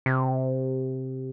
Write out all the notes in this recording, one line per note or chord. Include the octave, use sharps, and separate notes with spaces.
C3